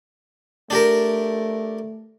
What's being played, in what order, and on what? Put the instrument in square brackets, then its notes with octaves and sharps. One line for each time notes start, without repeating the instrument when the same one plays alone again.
[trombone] A3 [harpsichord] D4 G4 A#4